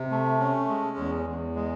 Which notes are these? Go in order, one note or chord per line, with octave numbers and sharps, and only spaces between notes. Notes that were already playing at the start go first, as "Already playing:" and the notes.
Already playing: C3
A3
C#4
G#3
E2
E2
G#3